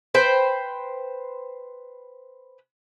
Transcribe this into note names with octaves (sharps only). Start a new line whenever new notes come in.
B4 C5 G5